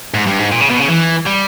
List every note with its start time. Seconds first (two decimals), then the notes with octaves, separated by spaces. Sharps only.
0.14 G#2
0.27 G2
0.39 G#2
0.52 A#2
0.60 C#3
0.70 B2
0.80 C#3
0.88 E3
1.26 G3